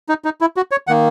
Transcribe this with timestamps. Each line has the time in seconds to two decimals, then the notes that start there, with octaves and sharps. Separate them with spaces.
0.09 D#4
0.25 D#4
0.41 E4
0.57 F#4
0.71 C#5
0.87 D#3 A#3 F#5